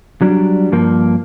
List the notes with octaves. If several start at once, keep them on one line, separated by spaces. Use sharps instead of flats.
F#3 G3 D4
G2 F3 A#3